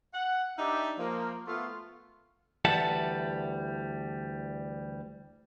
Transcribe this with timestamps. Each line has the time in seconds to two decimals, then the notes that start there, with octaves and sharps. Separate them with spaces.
0.14 F#5
0.58 D4 D#4 G4 D5 E5
0.98 F3 A#3
1.47 A3 B3 F4
2.65 D2 E3 G3 E5 F#5 A5